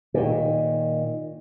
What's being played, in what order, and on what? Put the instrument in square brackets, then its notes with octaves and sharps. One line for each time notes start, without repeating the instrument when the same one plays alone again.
[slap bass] A#2 D#3